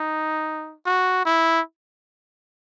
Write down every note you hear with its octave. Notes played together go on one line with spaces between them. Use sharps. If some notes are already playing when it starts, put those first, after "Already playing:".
Already playing: D#4
F#4
E4